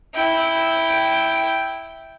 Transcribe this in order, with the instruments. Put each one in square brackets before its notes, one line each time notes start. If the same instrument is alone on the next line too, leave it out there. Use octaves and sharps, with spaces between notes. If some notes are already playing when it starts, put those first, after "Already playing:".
[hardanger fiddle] E4 G5